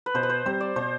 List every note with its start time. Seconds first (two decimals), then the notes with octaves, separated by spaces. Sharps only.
0.06 B4
0.14 B2 C5
0.23 B4
0.29 C5
0.46 G3 C4 G4 C5
0.60 D5
0.76 B2 C5